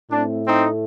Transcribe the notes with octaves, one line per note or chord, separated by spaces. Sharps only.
A2 A3 C4 D4
C4 D#4